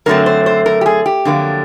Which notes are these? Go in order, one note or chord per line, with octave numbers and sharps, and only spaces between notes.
F#2 D3 F#3 A3 C4 A#4
C5
C5
A#4
G4
G#4
G4
F2 D3 F#3 A#3